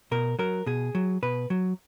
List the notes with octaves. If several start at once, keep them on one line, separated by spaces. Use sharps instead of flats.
B2 A#4
F#3 A#4
B2 G#4
F#3
B2 B4
F#3